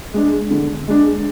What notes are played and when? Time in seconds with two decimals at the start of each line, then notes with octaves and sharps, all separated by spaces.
0.14 G#3 D4
0.51 D3
0.88 G#3 D4